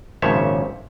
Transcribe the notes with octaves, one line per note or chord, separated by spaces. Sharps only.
G#1 A#2 C#3 F3 C#5 E5